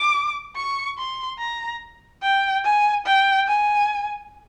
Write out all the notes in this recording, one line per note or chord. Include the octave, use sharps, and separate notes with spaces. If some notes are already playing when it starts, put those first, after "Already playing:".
Already playing: D6
C#6
C6
A#5
G5
G#5
G5
G#5